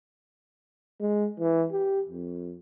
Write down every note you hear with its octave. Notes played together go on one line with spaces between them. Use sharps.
G#3
E3
G4
F2